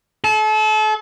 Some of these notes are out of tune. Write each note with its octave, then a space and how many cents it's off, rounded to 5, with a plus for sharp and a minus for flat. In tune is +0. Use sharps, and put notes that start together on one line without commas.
A4 -35